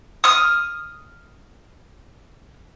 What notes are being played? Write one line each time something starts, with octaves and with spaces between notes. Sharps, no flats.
D#6 F6